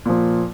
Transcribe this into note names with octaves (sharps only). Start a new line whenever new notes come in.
A#2 F3